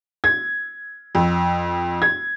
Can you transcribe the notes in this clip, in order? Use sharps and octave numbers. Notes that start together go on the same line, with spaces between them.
G#6
F2
G#6